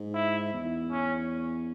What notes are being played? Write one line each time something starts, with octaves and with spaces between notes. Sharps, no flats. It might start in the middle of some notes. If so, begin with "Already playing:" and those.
Already playing: G#2
E4
E2
C#4